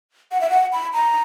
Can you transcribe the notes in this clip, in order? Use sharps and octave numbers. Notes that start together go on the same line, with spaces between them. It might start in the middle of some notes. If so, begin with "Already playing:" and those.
F#5
E5
F#5
B5
A#5